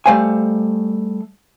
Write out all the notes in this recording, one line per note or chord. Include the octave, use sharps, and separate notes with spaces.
G3 A3 C5 F5 G#5